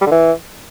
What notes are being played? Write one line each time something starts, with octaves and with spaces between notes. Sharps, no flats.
G3
D3
E3